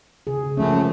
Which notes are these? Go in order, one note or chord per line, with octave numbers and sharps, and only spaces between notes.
C#3 G#4
F#2 F3 G#3 A3 C#4